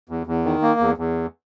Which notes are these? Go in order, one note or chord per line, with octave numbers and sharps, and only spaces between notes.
E2
E2
D#3
A#3
E2
E2